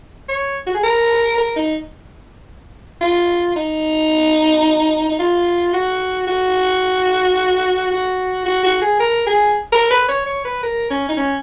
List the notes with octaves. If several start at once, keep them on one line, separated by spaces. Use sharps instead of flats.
C#5
F#4
G#4
A#4
A#4
D#4
F4
D#4
D#4
F4
F#4
F#4
F#4
F#4
F#4
G#4
A#4
G#4
A#4
B4
C#5
C#5
B4
A#4
C#4
D#4
C#4